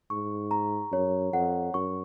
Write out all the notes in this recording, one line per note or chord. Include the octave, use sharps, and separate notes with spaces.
G#2 C#6
A#5
F#2 C#5
F2 F#5
F#2 C#6